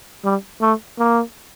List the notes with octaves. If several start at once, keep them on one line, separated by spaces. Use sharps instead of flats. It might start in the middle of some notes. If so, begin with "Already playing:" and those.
G3
A3
A#3